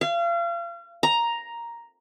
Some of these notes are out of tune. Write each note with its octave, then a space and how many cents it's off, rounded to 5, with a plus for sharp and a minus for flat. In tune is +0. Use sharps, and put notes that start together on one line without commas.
F5 -35
A#5 +5